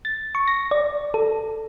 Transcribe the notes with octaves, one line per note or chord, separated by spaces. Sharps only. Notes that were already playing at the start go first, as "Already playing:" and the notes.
A6
C#6
A#6
D5
A4